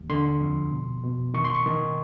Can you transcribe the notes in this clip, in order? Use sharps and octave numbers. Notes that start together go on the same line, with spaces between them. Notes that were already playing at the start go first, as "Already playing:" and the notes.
Already playing: D#2
D3 C6
F2
B2
B2
D#3 C#6
C6
C#6
D#3